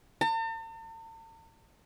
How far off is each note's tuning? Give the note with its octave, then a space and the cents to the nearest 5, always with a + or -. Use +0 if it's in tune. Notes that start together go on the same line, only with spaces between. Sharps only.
A5 +45